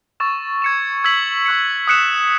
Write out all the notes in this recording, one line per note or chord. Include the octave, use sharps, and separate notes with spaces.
C#6 E6 A6 E7
G#6 C#7 E7
E6 G#6 B6 F#7
C#6 F#6 C#7
D#6 F#6 C#7 E7